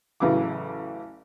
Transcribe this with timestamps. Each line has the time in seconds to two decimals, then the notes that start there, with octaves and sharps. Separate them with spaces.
0.20 A1 C#3 E3 F#3 D6